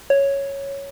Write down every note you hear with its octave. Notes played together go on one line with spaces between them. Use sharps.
C#5